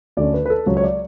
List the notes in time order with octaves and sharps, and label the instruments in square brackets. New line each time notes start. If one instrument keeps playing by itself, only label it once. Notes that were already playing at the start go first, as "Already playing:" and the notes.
[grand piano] D2 D3 A3 C#4 D5
B4
B4
A4
C#2 C#3 F#3 C#5
C#5
D5